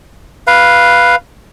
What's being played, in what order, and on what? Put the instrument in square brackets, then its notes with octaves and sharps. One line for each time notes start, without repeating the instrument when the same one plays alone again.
[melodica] B4 F5